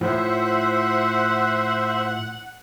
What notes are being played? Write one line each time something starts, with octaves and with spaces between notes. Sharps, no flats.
A2 F3 C5 E5 F#5